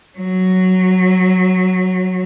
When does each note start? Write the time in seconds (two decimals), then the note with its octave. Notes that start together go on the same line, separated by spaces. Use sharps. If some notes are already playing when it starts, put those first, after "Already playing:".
0.18 F#3